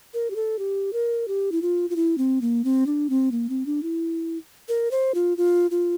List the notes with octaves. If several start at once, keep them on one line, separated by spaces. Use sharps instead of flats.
A#4
G4
A4
G4
A#4
G4
E4
F4
F4
E4
C4
A#3
C4
D4
C4
A#3
C4
D4
E4
A#4
C5
F4
F4
F4